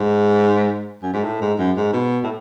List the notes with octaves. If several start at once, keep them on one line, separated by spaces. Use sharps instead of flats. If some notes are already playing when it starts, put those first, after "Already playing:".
Already playing: G#2
F#2
G#2
A2
G#2
F#2
G#2
B2
A2